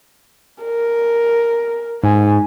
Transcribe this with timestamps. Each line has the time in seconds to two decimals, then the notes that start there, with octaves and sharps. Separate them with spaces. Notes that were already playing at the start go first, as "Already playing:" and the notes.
0.63 A#4
2.03 G#2 G#5